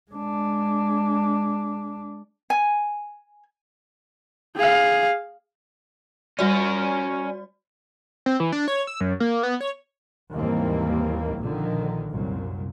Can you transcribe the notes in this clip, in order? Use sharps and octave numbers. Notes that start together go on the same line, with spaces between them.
G#3 D4
G#5
G#4 F5
G3 C#4 F#4 A#4 D5
C4
E3
D4
C#5
E6
F#2
A#3
B3
C#5
D#2 G#2 E3 G3 A#3 C4
A#1 A#2 D3 D#3 F3
C2 F#2 A#2